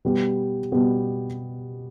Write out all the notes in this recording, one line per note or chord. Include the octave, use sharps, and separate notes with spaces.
B2 G3 B3 G4
B2 G3 B3 G4